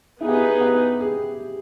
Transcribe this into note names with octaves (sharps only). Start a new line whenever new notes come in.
B3 D#4 E4 G#4 B4
G4
E4
G4
G#4